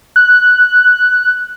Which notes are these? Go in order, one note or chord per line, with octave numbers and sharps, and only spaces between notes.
F#6